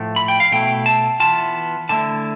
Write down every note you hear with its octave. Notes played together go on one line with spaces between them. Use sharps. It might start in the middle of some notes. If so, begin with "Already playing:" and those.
Already playing: A2 F3 A3
B5
G5
F5
B2 A3 E4 G5
A5
E3 B3 F4 A5
D3 A3 E4 A5